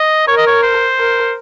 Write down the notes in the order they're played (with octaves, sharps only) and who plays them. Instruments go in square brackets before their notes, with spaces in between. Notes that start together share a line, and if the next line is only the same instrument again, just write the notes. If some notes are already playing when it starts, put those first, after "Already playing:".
Already playing: [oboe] D#5
[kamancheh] A#4 [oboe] C#5
[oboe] D#5
C#5
C5
[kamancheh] A#4